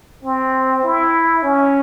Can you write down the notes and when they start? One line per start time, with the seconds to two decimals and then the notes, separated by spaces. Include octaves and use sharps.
0.24 C4
0.83 E4
1.43 C#4